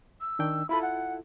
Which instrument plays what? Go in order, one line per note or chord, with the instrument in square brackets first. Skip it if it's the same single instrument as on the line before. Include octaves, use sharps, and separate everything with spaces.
[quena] E6
[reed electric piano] D#3 D4 G5
[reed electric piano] E4 F4 A4 [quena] B5
[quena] F#5